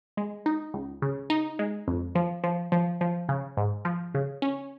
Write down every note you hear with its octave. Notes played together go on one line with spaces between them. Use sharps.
G#3
D#4
C#2
C#3
D#4
G#3
F2
F3
F3
F3
F3
C#3
G#2
F3
C#3
C#4